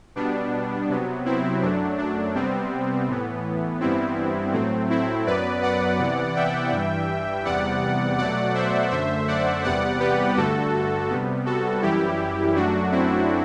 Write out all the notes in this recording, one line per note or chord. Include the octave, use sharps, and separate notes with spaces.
B2 G3 B3 D4
C3 F#3 B3
C4 E4
F#2 F#3 A3 D4
D4
C3 G3 B3 C4
A2 E3 B3
G2 E3 G3 B3 C4 E4
A2 F#3 A3 C4
C4 E4
F#2 F#3 B3 B4 D5
D5 F#5
C3 E3 B3
E5 G5
G2 E3 G3
E2 C3 G3 B3 D5 F#5
B2 F#3 A3 D5 F#5
C5 E5
F#2 D3 A3 C5 E5
D5 F#5
E2 C3 G3 B3 D5 F#5
G4 B4
G2 D3 A3 F#4 A4
C3 G3 B3
F#4 A4
F#2 E3 G3 E4 G4
F#2 F#3 A3 D4 F#4
C4 E4